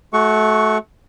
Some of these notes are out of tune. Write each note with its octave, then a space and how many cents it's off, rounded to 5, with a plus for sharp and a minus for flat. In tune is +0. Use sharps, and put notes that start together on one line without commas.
A3 -25 F#4 +5 C#6 +0